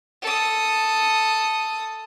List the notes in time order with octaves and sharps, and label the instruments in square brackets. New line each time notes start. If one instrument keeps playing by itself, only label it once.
[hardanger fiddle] A4 D#6